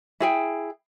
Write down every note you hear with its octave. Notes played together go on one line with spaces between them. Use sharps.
E4 G#4 G5